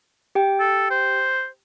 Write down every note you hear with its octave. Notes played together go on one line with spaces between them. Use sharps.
G4 G5
A4
C5